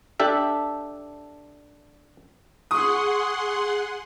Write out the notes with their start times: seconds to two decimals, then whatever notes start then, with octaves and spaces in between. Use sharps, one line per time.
0.20 D4 G4 A4 E5
2.71 G#4 F#5 C6 C#6 D#6